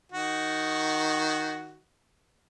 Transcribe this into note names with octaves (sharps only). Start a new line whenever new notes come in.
D#3 F#4